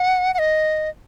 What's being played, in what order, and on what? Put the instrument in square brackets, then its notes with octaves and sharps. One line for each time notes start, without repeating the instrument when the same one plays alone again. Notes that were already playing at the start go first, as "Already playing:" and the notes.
Already playing: [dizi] F#5
F#5
D#5